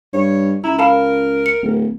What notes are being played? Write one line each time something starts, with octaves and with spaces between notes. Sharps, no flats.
G2 C#5
C#2 E4 A#5
A#4 F5 A5 B5
C#7
D1